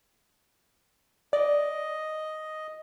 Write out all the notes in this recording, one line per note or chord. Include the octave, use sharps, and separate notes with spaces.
D5 D#5